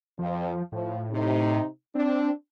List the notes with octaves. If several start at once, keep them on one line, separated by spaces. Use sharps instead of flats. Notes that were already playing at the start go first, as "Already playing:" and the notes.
F2 F3
A2 F3
C3 D#4
C4 D4